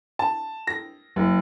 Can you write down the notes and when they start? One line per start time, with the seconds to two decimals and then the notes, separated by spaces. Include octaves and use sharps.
0.19 A5
0.67 A#6
1.16 F#1